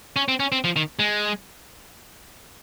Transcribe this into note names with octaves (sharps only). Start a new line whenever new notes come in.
C#4
C4
C#4
C4
F3
D#3
G#3